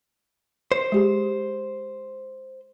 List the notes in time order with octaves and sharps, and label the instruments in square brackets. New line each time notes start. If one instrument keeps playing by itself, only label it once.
[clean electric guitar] C5
[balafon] G#3 G4 G#4